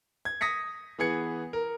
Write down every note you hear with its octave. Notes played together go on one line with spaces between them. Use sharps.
G#6
D#6 A#6 B6 C#7
E3 B3 G#4 G#6 C#7
A#4